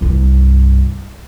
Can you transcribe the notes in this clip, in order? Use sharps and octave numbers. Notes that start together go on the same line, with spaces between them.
C2 G2